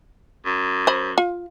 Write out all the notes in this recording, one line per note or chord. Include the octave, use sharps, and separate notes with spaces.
F#2
C5 B5
F4